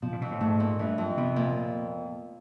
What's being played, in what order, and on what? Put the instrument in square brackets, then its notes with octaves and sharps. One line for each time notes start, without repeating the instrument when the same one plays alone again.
[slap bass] B2 [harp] F3
[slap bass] A#2
[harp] F2 [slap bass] B2
[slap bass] A2
[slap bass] G#2 [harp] A3
[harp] A#2
[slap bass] G2 [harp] E3
[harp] F2
[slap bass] C3 [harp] B3
[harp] A#2